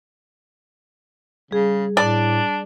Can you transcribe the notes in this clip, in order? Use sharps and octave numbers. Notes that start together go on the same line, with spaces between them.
C#3 G3 G#4
A2 D4 D5